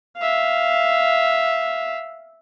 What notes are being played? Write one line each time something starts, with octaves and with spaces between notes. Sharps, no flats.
E5 F5